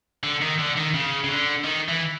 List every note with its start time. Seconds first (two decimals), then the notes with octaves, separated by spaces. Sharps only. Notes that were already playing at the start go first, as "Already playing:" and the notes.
0.24 D3
0.41 D#3
0.59 D3
0.76 D#3
0.94 C#3
1.24 C#3
1.29 D3
1.64 D#3
1.89 E3